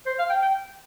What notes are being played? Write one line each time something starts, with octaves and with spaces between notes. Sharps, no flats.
C5
F5
G5
G5